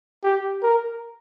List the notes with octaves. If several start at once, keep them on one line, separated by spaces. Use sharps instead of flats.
G4
A#4